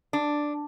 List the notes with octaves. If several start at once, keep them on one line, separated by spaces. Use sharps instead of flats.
D4